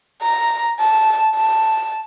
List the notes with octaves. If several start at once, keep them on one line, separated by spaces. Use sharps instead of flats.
A#5
A5
A5